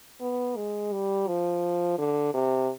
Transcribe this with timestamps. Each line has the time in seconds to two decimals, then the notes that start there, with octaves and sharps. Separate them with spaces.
0.21 B3
0.56 G#3
0.92 G3
1.28 F3
1.98 D3
2.34 C3